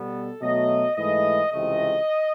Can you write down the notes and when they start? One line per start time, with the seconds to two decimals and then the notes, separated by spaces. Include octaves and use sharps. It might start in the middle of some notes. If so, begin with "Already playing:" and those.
Already playing: B2 G3 B3 A4
0.42 B2 F#3 A3 D#5
0.96 G#2 E3 A3 D#5
1.52 C#2 C3 E3 A3 D#5